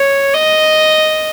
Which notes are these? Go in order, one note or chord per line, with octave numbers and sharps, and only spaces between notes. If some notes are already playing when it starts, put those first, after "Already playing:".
Already playing: C#5
D#5